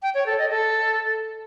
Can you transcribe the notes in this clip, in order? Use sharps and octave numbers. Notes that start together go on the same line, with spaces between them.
G5
C#5
A4
D#5
A4